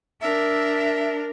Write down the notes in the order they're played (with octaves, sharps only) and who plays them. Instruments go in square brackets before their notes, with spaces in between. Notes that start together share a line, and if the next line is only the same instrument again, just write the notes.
[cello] D4 A#4 [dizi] E5